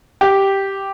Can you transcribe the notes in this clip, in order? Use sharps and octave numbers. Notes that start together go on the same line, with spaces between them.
G4